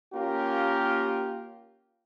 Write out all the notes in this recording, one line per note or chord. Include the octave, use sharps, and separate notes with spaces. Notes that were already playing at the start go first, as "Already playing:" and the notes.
A#3 C#4 F4 G4 A#4